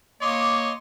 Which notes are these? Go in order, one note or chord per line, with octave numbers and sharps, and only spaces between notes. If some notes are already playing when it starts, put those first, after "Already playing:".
A#3 C#5 D#5 C6 D6